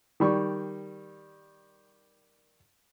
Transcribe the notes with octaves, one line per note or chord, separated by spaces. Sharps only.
D#3 G3 C#6